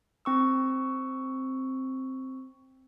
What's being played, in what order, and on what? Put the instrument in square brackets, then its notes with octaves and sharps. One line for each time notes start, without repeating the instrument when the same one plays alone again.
[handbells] C4 C#6 E6